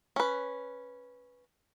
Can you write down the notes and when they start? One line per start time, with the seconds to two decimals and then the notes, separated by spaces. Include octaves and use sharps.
0.16 C#4 B4